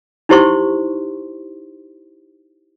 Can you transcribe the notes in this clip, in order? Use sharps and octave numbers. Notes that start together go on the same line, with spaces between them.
D#4 E4 G4 C5 C6 C#6